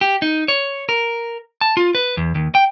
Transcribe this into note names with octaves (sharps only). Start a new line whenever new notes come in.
G4
D#4
C#5
A#4
A5
F4
B4
E2
D#2
G5